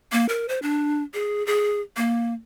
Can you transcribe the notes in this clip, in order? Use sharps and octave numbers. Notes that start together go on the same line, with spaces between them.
A#3
A#4
C5
D4
G#4
G#4
A#3